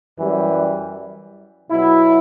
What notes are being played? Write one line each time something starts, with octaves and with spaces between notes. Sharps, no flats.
F#2 E3 G3
B2 F#3 E4